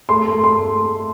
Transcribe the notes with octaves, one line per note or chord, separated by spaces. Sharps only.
A3 C6
A3
C6